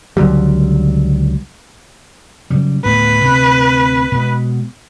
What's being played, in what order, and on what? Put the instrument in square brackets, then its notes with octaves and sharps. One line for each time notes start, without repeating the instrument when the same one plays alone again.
[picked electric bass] C#2 D3 F#3 G3
[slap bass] C#3 F#3 G3
[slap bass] D2 A2 B3 [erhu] B4
[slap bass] D2 C3
B2 G#3